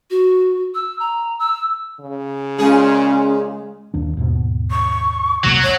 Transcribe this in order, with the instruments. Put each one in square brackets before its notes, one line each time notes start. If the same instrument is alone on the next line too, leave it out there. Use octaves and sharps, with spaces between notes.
[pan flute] F#4
E6
A#5
E6
[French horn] C#3
[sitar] A#2 G#4 [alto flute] G#3 [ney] C#4
[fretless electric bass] D#1 D#2 D4
D#2 G#2 B2
[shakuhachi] C#6
[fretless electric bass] E1 C2 A#2 [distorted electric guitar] F#3
[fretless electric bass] G#1 [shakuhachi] C#5